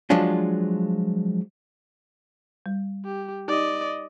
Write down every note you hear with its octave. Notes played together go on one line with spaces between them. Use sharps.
F3 F#3 G#3 D4 F4
G3
G4
D#4 G4 D5 D#5